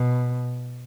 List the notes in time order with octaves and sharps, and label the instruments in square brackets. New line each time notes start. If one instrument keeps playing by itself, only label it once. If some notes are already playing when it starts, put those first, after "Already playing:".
Already playing: [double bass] B2